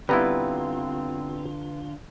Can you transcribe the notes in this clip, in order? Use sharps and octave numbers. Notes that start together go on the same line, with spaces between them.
D3 G3 B3 C4 E4 F4 B4 A#5